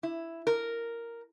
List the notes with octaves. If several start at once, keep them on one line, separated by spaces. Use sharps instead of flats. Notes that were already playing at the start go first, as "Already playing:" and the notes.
E4
A#4